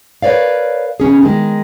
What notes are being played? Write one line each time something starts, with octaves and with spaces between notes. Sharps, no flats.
A#4 B4 C#5 D5 F5
B2 E3 C#4 G#4
D#3 G#3